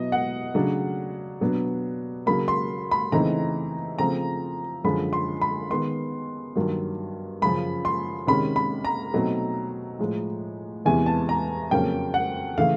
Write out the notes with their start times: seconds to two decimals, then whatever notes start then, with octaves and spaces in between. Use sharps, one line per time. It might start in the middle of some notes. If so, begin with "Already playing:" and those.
Already playing: B2 F#3 B3 E4 D#5
0.12 F#5
0.55 C#3 F#3 A3 D4
1.41 B2 F#3 B3 D4
2.26 C#3 F#3 A#3 B5
2.48 C6
2.91 B5
3.12 C#3 E3 A3 C4 D#4 A#5
3.99 C#3 F3 A3 C4 A#5
4.84 F#2 D3 F3 G#3 B5
5.13 C6
5.41 B5
5.70 D#3 G#3 B3 C6
6.56 G2 D#3 F#3 A#3
7.42 F#2 C#3 F3 B5
7.85 C6
8.27 C3 D#3 G#3 C#4 B5
8.56 B5
8.85 A#5
9.14 B2 F#3 A3 C4 D#4
9.99 A2 F3 G#3
10.85 E2 C3 E3 G#3 B3 G#5
11.06 A5
11.29 A#5
11.71 F2 C#3 F#3 A#3 C#4 G5
12.14 F#5
12.58 C#3 E3 A3 F5